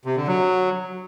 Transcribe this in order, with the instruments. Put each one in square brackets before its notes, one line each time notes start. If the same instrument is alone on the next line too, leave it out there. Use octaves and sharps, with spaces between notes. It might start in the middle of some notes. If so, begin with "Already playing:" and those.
[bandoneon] C3
D3
F#3